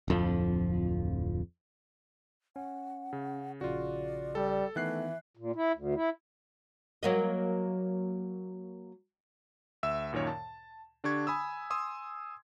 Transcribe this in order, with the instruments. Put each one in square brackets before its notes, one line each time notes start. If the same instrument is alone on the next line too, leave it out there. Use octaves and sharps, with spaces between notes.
[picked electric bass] D1 F2 F3
[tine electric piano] C#4 [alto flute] F#5
[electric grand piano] C#3
[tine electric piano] A#1 C#3 [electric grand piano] F4 F#4 [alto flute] D5
[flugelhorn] G3 [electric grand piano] A4
[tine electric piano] D#3 B3 [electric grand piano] E3 F#6 C7 [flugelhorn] A3 [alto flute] E5
[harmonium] A#2
E4
D2
E4
[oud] F#3 A#3 D#5
[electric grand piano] D2 E5 E6 E7
F#2 A#2 D#3 A#4 C#5
A5
D3 D4 G4 C#6 G#6
G#5 B5 D#6 E6
G#5 C6 D#6 E6